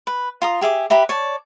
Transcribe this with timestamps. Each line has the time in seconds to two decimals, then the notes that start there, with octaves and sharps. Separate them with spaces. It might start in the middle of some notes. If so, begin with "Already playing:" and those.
0.07 B4
0.42 F4 A#5 D#6
0.61 G4 G#4 E5 D6
0.90 G4 B4 E5 A#5
1.09 C#5 D5 A5